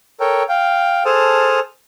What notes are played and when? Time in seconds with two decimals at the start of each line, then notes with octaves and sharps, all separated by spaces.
0.20 A4 A#4 C#5 G5
0.49 F5 G5
1.05 G#4 A4 C5 A5 D#6 F6